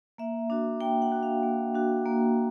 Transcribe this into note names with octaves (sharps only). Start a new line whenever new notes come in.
A#3 E5
D4 F#4
A#3 G5
F#5
D4 F#4
F5
A#3
D4 F#4
A#3